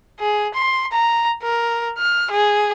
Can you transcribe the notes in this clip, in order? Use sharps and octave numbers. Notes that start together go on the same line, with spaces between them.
G#4
C6
A#5
A#4
F6
G#4